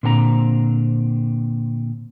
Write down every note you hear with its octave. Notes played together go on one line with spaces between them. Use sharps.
A#2 D3 C4 G#5 A#5